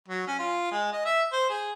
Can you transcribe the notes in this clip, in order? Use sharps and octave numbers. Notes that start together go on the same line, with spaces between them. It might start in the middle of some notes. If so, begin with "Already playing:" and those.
F#3
C#4
F4
G#3
D#5
E5
C5
G#4